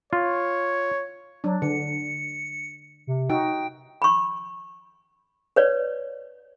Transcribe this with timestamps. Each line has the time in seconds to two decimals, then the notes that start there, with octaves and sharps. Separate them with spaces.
0.13 F4 C#5
1.44 F#3 D4
1.62 D3 C#7
3.07 C3
3.30 D#4 F#4 G5
4.02 B5 C#6
5.56 B4 C#5 D5